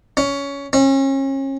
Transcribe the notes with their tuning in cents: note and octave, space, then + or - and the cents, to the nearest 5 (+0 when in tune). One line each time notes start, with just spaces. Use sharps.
C#4 +15
C#4 -35